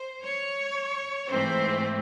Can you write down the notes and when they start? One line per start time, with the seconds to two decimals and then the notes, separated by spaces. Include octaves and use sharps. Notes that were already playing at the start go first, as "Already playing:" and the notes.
Already playing: C5
0.20 C#5
1.29 G#2 E3 A3 C4 C5